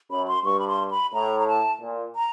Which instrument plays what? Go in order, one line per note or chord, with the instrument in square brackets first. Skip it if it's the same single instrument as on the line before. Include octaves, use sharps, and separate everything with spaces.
[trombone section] F#2 [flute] B5
[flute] C6
[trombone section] G2 [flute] C#6
[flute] B5
C6
B5
[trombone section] A2 [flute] A#5
[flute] A#5
A5
[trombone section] A#2
[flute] A#5